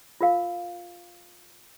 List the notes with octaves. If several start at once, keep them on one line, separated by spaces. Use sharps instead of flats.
F4 A#4 F5